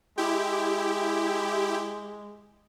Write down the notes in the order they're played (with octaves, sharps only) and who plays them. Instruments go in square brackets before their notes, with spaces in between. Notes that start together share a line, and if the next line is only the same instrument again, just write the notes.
[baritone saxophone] G#3 [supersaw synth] E4 G4